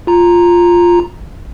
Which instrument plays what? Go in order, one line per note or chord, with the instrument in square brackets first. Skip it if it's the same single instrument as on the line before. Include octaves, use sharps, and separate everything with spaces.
[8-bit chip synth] F4 A#5